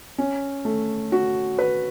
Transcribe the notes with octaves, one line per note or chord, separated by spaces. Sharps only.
C#4
A3
F#4
B4